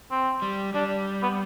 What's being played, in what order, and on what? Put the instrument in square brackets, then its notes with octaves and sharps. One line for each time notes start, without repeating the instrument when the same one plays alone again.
[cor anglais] C4
[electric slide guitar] G3
[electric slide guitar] G3 [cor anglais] D4
[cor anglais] B3